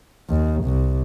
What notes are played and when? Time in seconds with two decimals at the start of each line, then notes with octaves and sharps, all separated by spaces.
0.29 D#2
0.64 C2